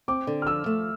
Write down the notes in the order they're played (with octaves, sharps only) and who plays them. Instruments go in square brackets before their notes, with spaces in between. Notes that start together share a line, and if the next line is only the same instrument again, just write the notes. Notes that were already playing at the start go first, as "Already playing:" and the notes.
[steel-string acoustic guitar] C4 [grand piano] D6
[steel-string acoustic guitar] D3
[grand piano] F6
[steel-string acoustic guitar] F3 [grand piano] E6
[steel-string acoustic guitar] A3